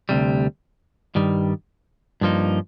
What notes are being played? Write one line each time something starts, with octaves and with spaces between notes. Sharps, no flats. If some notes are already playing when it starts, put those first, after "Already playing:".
D2 C3 G3
G2 D#3 G3
G2 F3 A#3 D#4